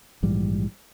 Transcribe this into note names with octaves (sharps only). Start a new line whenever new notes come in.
A#1 G#2 E3 G3